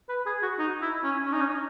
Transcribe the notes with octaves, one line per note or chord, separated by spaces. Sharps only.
B4
G#4
F#4
D#4
E4
C#4
C#4
D#4
C#4